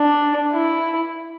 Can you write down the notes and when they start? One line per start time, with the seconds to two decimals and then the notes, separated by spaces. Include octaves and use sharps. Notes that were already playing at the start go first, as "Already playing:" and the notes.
Already playing: D4
0.53 E4